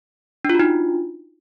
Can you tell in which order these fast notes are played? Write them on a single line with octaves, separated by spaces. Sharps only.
D4 F4 F#4 D#4